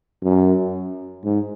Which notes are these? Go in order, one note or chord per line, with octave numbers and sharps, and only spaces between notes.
F#2
G#2